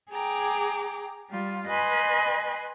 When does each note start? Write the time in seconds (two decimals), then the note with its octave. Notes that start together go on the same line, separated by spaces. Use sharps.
0.12 G#4 G5 A#5 D6
1.30 G3 F4
1.68 B4 D#5 G#5 B5 C6